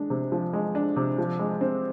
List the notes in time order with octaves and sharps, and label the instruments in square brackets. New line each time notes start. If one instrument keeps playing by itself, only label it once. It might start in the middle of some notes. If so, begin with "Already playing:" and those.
Already playing: [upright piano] G#3 D4
C3
F3
G#3
D4
C3
F3
G#3
C4